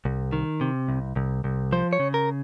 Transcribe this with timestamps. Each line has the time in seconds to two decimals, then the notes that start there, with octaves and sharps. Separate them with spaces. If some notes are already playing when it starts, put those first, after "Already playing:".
0.05 C2
0.33 D#3
0.61 C3
0.88 C2
1.16 C2
1.44 C2
1.72 F3 C5
1.93 C#5
2.00 C#3
2.14 A#4